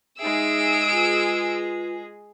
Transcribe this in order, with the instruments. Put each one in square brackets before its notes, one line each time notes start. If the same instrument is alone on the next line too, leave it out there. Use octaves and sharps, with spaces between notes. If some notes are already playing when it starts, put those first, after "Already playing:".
[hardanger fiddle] G#3 G#4 [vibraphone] D#4 E5 [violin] E6 D7
[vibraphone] F4 B4